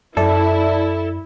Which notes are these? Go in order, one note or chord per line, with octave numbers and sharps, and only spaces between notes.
F#2 E4 A4 D5 E5